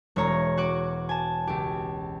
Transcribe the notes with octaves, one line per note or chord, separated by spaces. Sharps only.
E1 G#3 C#5 A#5
F#4 F#5 D6
G#5 A5
C#2 G4